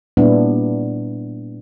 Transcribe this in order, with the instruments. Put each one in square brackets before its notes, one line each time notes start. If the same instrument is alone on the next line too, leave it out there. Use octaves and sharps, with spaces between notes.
[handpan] A#2 G3 B3 D4 E4